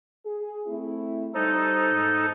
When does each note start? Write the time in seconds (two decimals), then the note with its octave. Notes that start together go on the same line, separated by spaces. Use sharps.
0.25 G#4
0.67 A3 C4 E4
1.35 G3 D#4 A4 C5
1.91 E2 G#2